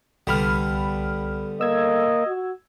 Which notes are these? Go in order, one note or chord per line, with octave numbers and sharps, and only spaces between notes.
C2 D3 G3 B3 B5 F6
A#3 D#5 E6 G#6
F#4